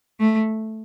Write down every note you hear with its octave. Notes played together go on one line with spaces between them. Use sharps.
A3